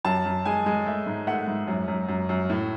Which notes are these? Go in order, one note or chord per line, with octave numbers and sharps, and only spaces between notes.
F#2 A5
F#2
G#3 G#5
G#3
A3 E5
G#2
A3 F#5
G#2
F#2
F#2
F#2
F#2
A2